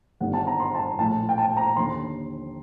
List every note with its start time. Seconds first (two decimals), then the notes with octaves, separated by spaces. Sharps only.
0.20 G1 G2 D#3 F#5
0.33 A5
0.47 A#5
0.60 C6
0.75 A5
0.79 A#5
0.98 A#1 A2 A5
1.29 G5
1.38 A5
1.57 A#5
1.76 D#2 D3 C6